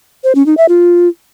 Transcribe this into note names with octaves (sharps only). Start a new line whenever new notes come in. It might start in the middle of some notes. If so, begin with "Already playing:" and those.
C5
C#4
D#4
E5
F4